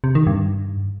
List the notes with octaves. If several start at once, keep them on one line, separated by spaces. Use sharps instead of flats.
C3
D#3
G2